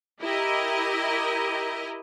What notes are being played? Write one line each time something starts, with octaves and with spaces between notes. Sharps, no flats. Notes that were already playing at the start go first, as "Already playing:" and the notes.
E4 G4 A#4 D#5